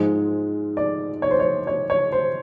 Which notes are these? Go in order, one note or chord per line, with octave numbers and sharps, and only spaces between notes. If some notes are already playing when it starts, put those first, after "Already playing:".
Already playing: G#2 F3 G#3
D5
C#5
C5
C#5
C#5
C#5
C5